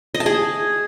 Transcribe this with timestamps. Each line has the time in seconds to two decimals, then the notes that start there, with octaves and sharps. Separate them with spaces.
0.14 D#5
0.20 A5
0.26 G#4